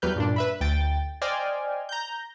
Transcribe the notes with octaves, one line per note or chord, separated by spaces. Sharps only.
E2 F#3 G3 B4 F6 G6
G2 A#2 D4
B4 E5 B5
D2 G5 A6
C5 D5 D#5 G5 G#5 F6
A#5 G6